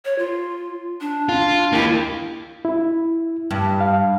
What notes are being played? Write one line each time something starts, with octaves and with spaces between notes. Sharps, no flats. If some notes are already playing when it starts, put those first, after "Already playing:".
C#5
F4
D4
F4
A#3 E4 G4
E4
G2
F5